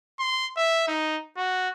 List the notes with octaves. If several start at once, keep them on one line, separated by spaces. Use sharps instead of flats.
C6
E5
D#4
F#4